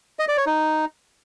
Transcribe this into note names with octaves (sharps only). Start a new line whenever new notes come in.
D#5
D5
C#5
D#4